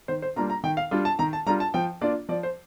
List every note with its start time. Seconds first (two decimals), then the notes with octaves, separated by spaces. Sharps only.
0.08 D#3 C5
0.22 C5
0.36 G3 A#3 D4 F4 A#5
0.50 A#5
0.64 D#3 G5
0.77 F5
0.91 G3 D4 F4
1.05 A5
1.19 D#3 A#5
1.33 A5
1.46 G3 D4 F4 A#5
1.60 A5
1.74 F3 G5
2.01 A#3 D4 F4 D5
2.29 F3 D5
2.43 C5